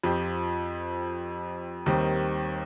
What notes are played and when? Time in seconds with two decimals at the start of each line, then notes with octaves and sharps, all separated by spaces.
0.04 F2 F3 C4 G4 C5
1.86 D#2 D#3 G3 C4